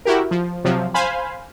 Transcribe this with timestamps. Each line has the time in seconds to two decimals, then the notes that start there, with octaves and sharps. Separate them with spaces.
0.05 E4 F#4 G4 A#4
0.31 F3
0.64 C3 F3 F#3
0.94 C5 F5 G#5 B5